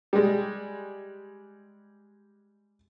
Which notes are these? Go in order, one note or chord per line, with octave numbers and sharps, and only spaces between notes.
G3 G#3